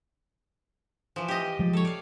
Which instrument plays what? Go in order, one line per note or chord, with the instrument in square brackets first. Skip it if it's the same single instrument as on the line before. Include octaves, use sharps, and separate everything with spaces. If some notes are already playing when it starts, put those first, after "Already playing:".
[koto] E3 F3
G4 D#5
[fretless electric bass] F3 G#3
[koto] A4 C#5
D5 F5